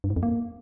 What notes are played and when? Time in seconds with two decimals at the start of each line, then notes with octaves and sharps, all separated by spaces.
0.04 G2
0.10 G#2
0.16 F2
0.23 A#3